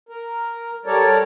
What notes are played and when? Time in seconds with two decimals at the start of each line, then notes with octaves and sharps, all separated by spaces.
0.09 A#4
0.86 G3 A4 A#4 C#5 D5